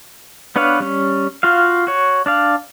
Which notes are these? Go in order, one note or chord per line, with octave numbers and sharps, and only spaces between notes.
B3 D4 B4 C#5 F5
G3 C#4
F4 F#4 F5
F#4 C#5
D4 D5 F5